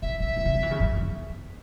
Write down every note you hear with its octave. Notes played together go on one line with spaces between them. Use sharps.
A#2 E5
A#2 E5
G#2
B2
F#3
E3
C#3
F#2
E2